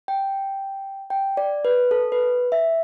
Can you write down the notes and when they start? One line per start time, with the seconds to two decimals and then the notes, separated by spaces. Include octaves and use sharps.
0.08 G5
1.10 G5
1.37 D5
1.65 B4
1.91 A4
2.12 B4
2.52 E5